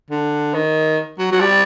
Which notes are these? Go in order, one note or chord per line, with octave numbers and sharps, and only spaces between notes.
D3
D#3
F#3
F#3
G3